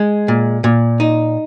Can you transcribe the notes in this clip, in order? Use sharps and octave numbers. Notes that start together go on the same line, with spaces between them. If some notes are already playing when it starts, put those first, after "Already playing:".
Already playing: G#3
A#2
A#2
D#4